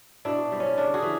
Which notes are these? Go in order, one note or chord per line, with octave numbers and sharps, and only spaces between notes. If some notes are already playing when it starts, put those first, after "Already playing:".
B2 D4 E4
G3 C4
C#4
C#3 D4
F#4 G#4
E3